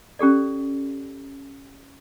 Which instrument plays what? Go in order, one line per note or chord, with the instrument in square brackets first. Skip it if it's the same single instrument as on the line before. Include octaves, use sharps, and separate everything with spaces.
[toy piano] C#4 G4 A4 D5